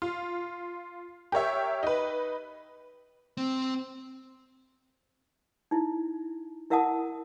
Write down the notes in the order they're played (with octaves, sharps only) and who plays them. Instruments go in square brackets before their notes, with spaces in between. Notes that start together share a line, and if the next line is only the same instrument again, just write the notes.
[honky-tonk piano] F4
G4 A#4 C#5 E5
D#4 B4
[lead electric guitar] C4
[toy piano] D#4 E4
E4 A#4 E5 F#5 A5 D#6